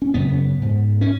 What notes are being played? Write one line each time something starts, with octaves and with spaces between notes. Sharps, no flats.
C#4
F#2 C#3 B3
G#2
C#4